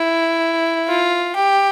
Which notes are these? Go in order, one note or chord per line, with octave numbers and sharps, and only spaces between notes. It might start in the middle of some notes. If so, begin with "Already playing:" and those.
Already playing: E4
F4
G4